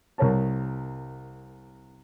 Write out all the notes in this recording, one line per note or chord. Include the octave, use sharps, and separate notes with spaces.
C2 A#4 C#5 A5